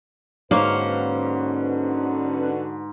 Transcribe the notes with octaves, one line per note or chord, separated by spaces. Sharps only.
G#2 D3 A#3 C#4 F#4 B4 C5 F5